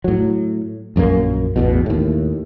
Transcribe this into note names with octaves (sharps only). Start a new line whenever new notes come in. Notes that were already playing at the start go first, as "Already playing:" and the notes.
A2 F#3
A#1 F#2 D3 A#3
A1 E2 B2
D#2 A2